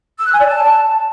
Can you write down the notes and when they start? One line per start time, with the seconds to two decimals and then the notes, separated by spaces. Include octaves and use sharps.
0.18 E6
0.25 F#6
0.33 G#5
0.40 D5
0.47 A5